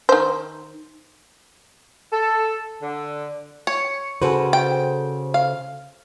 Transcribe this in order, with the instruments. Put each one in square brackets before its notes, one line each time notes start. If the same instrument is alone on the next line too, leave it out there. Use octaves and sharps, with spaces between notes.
[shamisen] D#3 C5
[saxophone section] A4
D3
[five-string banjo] C#5 [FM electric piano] C#7
[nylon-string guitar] C#3 F#4 B4 [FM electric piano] A4 C5
[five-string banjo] G5
F5